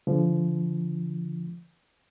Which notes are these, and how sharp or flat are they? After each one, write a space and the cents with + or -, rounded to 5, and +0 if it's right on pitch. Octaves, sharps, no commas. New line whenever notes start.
D3 -30 F3 -30